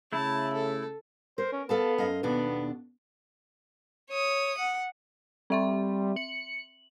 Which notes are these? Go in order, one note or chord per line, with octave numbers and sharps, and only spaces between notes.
C#3 A3 E4 A5
A4
A#4 C5
C#4
B3 A4 F5 A5
F#2 D#5 F5
D#2 B2 B3 D4
C#5 D#6
F#5
G3 C4 E5 C6
C#7 F#7